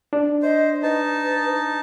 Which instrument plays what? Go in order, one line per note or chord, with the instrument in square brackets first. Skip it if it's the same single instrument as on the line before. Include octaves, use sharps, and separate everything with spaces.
[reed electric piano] D4
[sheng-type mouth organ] C5 [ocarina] D#5
[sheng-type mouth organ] D#4 A5 [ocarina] B4